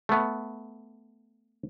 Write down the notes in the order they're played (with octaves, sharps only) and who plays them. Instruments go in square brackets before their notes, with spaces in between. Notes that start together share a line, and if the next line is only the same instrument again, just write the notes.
[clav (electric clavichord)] A3 B3